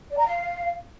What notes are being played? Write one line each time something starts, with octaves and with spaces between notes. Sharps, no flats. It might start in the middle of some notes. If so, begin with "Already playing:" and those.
D5
A#5
F5